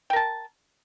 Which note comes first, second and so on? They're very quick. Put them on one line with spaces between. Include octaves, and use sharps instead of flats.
G5 A#4 A5